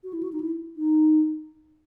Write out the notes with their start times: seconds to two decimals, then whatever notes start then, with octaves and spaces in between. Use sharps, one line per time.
0.04 F#4
0.13 E4
0.23 F#4
0.33 D#4
0.40 E4
0.77 D#4